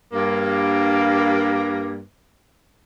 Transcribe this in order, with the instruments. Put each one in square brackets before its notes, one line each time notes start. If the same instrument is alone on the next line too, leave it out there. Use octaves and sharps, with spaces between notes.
[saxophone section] G2 A#3